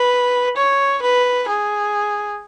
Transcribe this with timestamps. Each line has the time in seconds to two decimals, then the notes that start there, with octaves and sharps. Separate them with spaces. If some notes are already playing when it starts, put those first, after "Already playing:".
Already playing: B4
0.57 C#5
1.02 B4
1.48 G#4